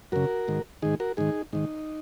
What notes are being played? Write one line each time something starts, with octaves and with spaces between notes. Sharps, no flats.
F#2 C#3 F#4 A#4
G#2 D#3
G#2 D#3 D#4 G#4
F#4 A#4
G#2 D#3 D#4 G#4
G#2 D#3 D#4